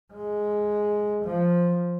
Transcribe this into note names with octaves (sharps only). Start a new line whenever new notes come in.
G#3
F3